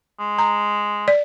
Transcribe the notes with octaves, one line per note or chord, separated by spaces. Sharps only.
G#3
A#5
D5